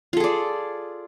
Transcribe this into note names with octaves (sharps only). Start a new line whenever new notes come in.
F4 G#4 A4 D5